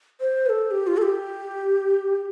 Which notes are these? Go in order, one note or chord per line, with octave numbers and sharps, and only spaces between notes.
C5
B4
A4
G4
F4
A4
G4